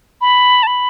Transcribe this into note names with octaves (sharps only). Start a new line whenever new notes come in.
B5
A5
B5